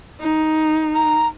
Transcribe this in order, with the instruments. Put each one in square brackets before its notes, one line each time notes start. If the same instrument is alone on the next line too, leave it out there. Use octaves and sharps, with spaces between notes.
[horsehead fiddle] D#4
[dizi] A#5